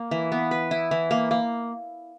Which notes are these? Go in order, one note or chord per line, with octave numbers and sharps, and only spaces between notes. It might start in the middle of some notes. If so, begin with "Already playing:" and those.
Already playing: A#3
E3
B3
B4
E4
E3
A#3
A#3